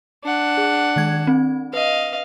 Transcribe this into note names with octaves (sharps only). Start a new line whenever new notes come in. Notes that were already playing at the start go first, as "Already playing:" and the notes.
D4 F#5
G#4
D#3 G#3 G#6
C4
B4 D#5 F5